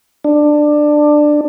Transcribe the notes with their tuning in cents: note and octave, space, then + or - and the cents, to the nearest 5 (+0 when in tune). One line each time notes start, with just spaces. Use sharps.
D4 +15